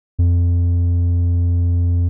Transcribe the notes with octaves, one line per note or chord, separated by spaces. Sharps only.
F2